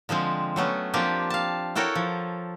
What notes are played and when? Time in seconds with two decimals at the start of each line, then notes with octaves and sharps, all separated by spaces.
0.09 D3 F3 G#3 C4
0.56 F#3 A3 B3 C#4
0.94 F3 A#3 C4 D4 G4
1.30 F5 A5
1.75 E4 F#4 A4 A#4 C#5 G5
1.95 F3